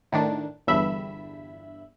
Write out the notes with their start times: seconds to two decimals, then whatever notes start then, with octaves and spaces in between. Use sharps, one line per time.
0.12 A2 D#3 D4
0.67 G1 E2 G2 E5 B5